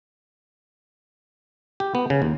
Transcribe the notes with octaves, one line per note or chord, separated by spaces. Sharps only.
G4
B3
C#3
D#2